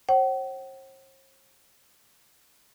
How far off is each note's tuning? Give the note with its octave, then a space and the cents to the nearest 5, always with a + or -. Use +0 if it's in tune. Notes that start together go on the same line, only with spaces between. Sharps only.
C5 +45 F#5 +45